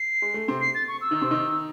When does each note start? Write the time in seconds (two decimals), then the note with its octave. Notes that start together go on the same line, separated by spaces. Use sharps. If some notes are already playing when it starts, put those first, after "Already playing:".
Already playing: C7
0.22 G#3
0.34 A3
0.48 C3 C4
0.61 C7
0.75 A6
0.88 C#6
1.01 E6
1.11 D#3 D#4
1.22 C3 C4
1.31 D#3 D#4